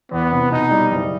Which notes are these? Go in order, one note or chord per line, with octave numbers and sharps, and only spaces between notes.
E2 B3
C3
B2 D#4
G3
F#1